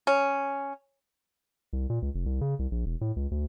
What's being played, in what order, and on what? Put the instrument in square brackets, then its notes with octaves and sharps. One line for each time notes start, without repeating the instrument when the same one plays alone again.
[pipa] C#4
[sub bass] C2
A#2
C#2
F1
C2
C#3
C2
A#1
E1
A2
C#2
D2